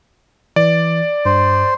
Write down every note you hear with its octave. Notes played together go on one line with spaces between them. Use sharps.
E3 D5
G2 C5